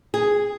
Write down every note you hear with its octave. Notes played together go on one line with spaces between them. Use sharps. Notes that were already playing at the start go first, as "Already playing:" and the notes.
G#4